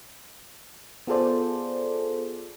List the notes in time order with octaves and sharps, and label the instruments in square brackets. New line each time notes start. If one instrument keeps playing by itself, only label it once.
[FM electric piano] B3 F4 G#4 A4 C5 D5